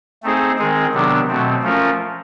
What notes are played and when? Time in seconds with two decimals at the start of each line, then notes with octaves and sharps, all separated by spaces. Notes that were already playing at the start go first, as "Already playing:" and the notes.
0.23 A3 C4 D#4 G#4 C5
0.58 D#3 G#3 C4 D#4 G#4
0.93 C3 D#3 F#3 B3 D4
1.27 B2 F#3 A3 C4
1.62 F3 A3 C#4 F4 A#4